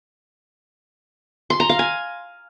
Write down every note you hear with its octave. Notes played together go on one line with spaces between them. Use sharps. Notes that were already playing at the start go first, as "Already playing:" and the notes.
C6
A#5
F5
G#5